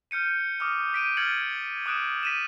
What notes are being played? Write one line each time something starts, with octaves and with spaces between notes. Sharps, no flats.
F6 G6 C#7 D#7
D6 D#6 F6
B6 D7 D#7
F6 G#6 A6 C#7 D#7 F#7
D6 D#6 F#6 D7 E7
B6 D#7 E7